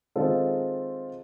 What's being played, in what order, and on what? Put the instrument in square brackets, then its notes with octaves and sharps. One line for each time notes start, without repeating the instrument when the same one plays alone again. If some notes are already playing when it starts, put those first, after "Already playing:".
[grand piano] D#3 G#3 C4 F4 A4